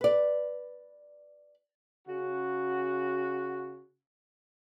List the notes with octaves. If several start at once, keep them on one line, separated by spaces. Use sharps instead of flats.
B4 D5
C#3 F#4